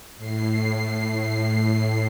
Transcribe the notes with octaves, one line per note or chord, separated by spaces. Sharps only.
A2 C7